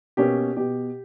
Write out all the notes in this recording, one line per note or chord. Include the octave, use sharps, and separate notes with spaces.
B2 A#3 C#4 G4
B2 G4